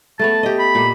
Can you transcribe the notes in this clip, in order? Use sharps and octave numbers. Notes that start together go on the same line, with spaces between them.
A3 B3 C#5 A5
G4 D#5
B5
A#2 A#3